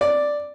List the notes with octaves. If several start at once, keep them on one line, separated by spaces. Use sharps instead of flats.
D5